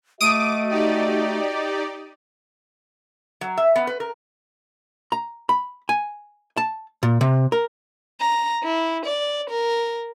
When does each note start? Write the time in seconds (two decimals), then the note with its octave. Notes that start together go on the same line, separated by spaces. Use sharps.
0.21 A3 F#4 D#5 D6 D#6 D7 D#7
0.70 D#4 G4 D5
3.41 F#3
3.57 E5
3.76 B3
3.87 B4
4.00 A#4
5.12 A#5
5.49 B5
5.89 G#5
6.57 A5
7.03 A#2
7.21 C3
7.52 A#4
8.20 A#5
8.63 E4
9.05 D5
9.49 A#4